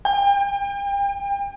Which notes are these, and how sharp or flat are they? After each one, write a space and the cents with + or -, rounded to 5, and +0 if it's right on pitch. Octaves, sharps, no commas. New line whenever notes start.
G5 +40